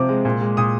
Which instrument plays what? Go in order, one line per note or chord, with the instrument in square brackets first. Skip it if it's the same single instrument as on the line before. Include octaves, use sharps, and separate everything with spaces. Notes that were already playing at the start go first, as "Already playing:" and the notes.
Already playing: [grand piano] C3 F3 C4 D6
G#3
A#2
G#3
A#2 D#6